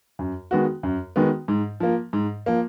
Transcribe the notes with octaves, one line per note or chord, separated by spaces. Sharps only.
F#2
D#3 G#3 B3 F#4
F#2
D#3 G#3 B3 F#4
G#2
F3 A#3
G#2
F3 A#3